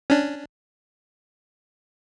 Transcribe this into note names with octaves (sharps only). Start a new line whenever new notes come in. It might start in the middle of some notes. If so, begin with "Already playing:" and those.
C#4 D4